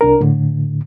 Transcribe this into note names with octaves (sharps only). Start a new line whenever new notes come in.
C2 D4 A#4
A2 D3